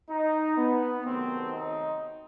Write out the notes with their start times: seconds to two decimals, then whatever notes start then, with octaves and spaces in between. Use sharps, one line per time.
0.10 D#4
0.57 B3
1.05 C3 D#3 F#3 A3 C4
1.51 D#4